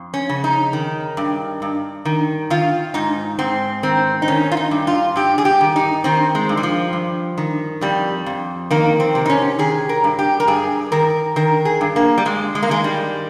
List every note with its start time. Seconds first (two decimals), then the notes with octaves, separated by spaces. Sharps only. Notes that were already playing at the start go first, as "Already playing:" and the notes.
Already playing: F2
0.14 C#4
0.29 C#3
0.44 D#4
0.73 D#3
1.17 G2
1.62 G2
2.05 D#3
2.50 D#3 F4
2.94 G#2 D#4
3.39 G#2 C4
3.83 D#3 C4
4.22 D#4
4.28 D#3 C#4
4.52 F4
4.57 D#4
4.71 G2
4.87 F4
5.16 G2 G4
5.38 G#4
5.45 G4
5.61 D#3
5.76 D#4
6.04 D#3 C4
6.35 G#3
6.49 G2
6.57 G3
6.63 F3
6.93 G2
7.38 D#3
7.81 F2 G3
8.26 F2
8.71 D#3 A#3
9.00 C4
9.15 C3
9.26 D#4
9.30 C#4
9.59 D#3 G#4
9.89 A#4
10.04 G2
10.19 G4
10.40 A#4
10.47 G2 G#4
10.92 D#3 A#4
11.36 D#3 A#4
11.65 G#4
11.81 G2
11.96 A#3
12.18 G3
12.25 G2 G#3
12.55 G#3
12.63 A#3
12.69 D#3 G#3
12.84 G3